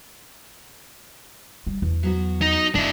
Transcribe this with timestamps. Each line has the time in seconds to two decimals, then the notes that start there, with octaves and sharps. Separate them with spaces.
1.67 G3
1.82 E2
2.03 F#3 B3 F#4
2.42 D#4
2.75 F#2 D4 E4